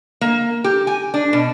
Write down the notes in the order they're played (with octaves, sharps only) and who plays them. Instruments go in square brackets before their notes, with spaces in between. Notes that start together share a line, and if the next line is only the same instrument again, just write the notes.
[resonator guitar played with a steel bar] A#3
G4
G#5
D4
B2